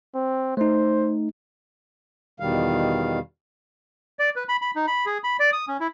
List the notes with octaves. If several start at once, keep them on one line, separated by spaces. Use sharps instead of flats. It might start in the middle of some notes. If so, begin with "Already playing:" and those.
C4
A3 D#4 C5
E2 B2 D#3 G3 F5
D5
B4
B5
B5
D#4
B5
G#4
B5
D5
D#6
C#4
E4